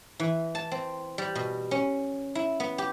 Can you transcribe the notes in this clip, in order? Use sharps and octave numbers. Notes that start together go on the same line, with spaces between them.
E3
A5
C4
G3
B2
C#4
E4
B3
G4